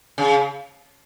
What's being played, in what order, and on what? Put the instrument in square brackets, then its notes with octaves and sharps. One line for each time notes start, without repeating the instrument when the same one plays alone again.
[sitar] C#3